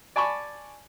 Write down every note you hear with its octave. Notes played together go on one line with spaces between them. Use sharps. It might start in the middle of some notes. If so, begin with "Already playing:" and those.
D5 G#5 A5 B5 C#6